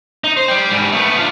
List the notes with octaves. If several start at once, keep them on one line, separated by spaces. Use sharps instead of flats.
D#4
C5
D5 G5
G#2 G3
A3 B3
D4 F4